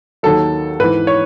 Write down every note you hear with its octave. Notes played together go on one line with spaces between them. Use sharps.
D#2 D#3 F#3 A4
G#2 E3 B4
C#5